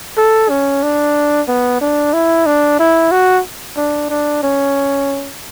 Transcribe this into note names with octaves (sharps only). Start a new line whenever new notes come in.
A4
C#4
D4
B3
D4
E4
D4
E4
F#4
D4
D4
C#4